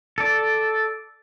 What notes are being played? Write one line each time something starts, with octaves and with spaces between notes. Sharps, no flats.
A4 D5